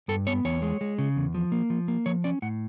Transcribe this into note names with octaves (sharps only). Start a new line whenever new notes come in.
G2 A4
B3 C#5
E2 C#5
G#3
G#3
C#3
E2
F3
A#3
F3
A#3
F3 C#5
C#4 D5
A2 F#5